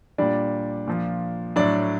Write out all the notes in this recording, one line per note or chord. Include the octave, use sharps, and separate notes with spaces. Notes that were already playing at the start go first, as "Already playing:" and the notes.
A#2 G3 D4 D5
A#2 F3
A2 F#3 D4 D5